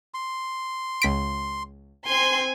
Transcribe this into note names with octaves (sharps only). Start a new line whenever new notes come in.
C6
C#2 B6 D7
C4 G#5 C6